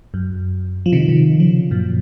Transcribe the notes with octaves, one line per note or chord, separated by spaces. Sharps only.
F#2
F3
C3 D#3
C3 D#3
C#3 F3
F#2 A#2